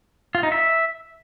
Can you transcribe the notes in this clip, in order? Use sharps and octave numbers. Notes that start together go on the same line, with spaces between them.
F4
D#4
E5